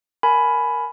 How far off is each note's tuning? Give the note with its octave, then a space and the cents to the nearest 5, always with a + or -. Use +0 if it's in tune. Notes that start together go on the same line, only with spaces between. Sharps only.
A#4 +5 G#5 +20 B5 +5